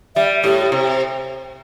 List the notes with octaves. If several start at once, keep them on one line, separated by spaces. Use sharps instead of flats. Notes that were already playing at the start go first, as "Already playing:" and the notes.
G3 E5
A2 G4
C3